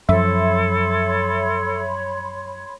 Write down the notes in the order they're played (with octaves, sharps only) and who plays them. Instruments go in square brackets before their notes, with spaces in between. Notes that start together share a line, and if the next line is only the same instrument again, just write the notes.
[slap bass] F#2 F3 [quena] A4 [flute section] C#5 B5 C6 [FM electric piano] E5